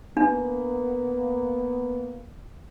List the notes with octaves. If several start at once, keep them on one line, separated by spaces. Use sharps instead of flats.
A#3 B3 D4